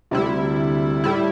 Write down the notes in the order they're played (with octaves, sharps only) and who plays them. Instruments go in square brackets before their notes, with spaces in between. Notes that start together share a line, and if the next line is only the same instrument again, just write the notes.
[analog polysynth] D2 C3 G3 E4
A2 G3 E4